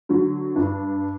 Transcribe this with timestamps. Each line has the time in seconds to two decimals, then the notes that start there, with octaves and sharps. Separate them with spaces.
0.09 D3 F#3
0.55 G2 D4